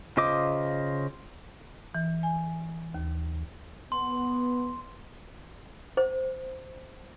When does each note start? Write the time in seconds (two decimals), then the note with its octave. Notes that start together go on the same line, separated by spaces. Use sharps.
0.17 C#3 F4 C5 D#5 D6
1.95 E3
2.23 G#5
2.94 D#2
3.92 B3 C6
5.97 C5